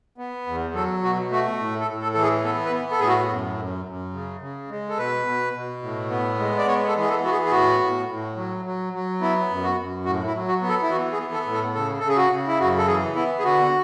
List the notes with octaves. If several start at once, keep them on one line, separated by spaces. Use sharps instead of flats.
B3
E2
F#3 A4
B2 F#4
A3 F#4
A2
A4
A2
A4
E3 A4
G#4
B3 A4
B4
B3
A4
A2 G#4
F#4
F#2
F#2
F#2
C#3
C#3
G#3
A4
B2 B4
B2
B2
A2
B3
G#3
D5
B3 C#5
A4
E3
G#4
A4
B3 F#4
G#4
G#4
A2 F#4
A2
A2
F#3
F#3
F#3
B3 E4
F#2
F#4
F#2
A2 F#4
E4
F#3
F#4
B3
A4
E4
E3 F#4
G#4
B3
A4
A2
A4
C#3 A4
C#3 A4
G#4
F#4
C#3
E4
F#2 F#4
A4
E3 G#4
B3 E4
G#4
D3 F#4